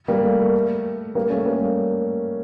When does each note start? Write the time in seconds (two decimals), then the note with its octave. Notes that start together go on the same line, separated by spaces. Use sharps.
0.08 G3 A#3
0.23 A3
0.39 A3
1.15 G3 A#3
1.30 A3 C#4
1.45 G3 A#3